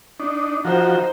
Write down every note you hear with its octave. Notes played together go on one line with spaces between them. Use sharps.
D4 D#4
F3 D#4 F#4 C5